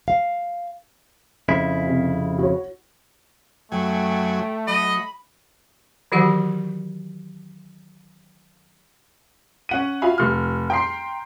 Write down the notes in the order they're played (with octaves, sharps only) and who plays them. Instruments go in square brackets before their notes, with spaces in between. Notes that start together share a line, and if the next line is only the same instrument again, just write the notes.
[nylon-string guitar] F5
[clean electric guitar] F2 C#3 E4
[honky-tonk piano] C3
F#4 C#5
[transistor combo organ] F#2 F#3 G#5 [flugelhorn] A3 [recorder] G5
[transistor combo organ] F#3 [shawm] D#5 [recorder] B5
[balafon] D#3 E3 F#3 F#4 G4 F#5
[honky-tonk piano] C#4 F#5 D#7
F4 F#4 E5 F5 G#5 B5
F1 F6
G5 A#5 C6 C7